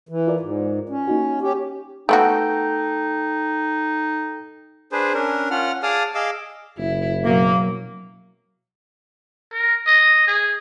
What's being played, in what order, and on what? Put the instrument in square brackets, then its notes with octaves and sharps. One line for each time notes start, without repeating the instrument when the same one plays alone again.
[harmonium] E3
[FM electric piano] F4 A#4 D5
[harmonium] G#2
C#4
[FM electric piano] A#3 D#4 F#4
[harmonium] C#4 G4
[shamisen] A3 B3 F#4 [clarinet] D#4 [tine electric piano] A4 G5
[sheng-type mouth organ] D4 G#4 B4 C5
C#4 D4 A#4
C#4 F4 F#5 F6
G#4 D5 F5 A5 D#6 F6
G#4 D#5 F5 D6 E6
[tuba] F#1 [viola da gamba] E4
[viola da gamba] B2 F#3 [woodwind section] A#3
[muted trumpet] A#4
D#5
G#4